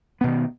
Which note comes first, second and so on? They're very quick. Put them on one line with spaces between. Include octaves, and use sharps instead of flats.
B3 B2 D#3